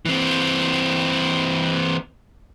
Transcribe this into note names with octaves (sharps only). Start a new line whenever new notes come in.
E3 C4